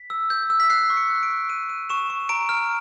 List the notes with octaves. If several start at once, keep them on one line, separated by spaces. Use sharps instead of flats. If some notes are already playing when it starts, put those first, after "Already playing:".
Already playing: B6
E6
G6
E6
B6
F#6 C7
C#6
C#7
F#6
D7
F#6
F#6 D#7
F#6 D#7
C#6 E7
C#6
A#5 D7
F6